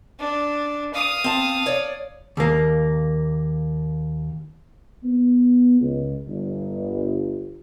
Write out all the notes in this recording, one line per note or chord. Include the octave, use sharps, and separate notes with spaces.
D4
F5 D#6
C4 A5
C#5 D5
D#2 A#3
B3
C#2
G1